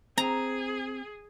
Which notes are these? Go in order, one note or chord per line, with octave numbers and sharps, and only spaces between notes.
C4 G#4 A#5